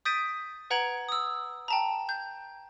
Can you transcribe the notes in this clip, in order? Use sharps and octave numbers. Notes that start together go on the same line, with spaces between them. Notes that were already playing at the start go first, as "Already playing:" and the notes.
D#6 G6 A6 B6 D7 D#7
B4 F#5 A#5 G#6 D7 F#7
D#6 E6
G5 A5 A#5
G6